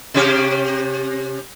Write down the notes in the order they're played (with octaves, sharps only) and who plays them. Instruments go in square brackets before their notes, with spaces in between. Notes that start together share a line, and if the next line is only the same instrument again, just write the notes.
[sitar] C3 C#4 G4